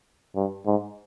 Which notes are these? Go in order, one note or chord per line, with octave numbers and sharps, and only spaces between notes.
G2
G#2